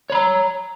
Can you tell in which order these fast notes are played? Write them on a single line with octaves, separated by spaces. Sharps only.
C#5 B5 A#5